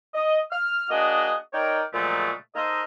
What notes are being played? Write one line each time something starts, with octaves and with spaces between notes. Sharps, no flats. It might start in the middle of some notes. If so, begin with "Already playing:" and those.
D#5
F6
A#3 D4 F#4 G#4 D#5
D#4 A#4 C#5 D5 G5
A#2 C#3 F3 F#3 G#3 A3
D#4 A4 A#4 C5 D#5